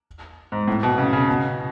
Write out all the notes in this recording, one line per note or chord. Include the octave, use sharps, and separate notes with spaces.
G#2
A2
B2
C#3
C#3
B2